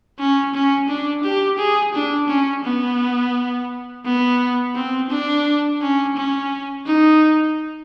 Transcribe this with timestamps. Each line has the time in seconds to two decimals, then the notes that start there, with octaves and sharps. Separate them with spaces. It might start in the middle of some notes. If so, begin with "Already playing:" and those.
0.19 C#4
0.54 C#4
0.88 D4
1.23 G4
1.58 G#4
1.94 D4
2.29 C#4
2.65 B3
4.05 B3
4.75 C4
5.10 D4
5.81 C#4
6.16 C#4
6.86 D#4